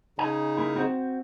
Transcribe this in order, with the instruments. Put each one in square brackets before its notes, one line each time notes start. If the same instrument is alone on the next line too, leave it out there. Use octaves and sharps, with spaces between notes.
[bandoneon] C#3 D#4 [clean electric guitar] G#5
[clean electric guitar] A#3 E4
C4 F#4 C5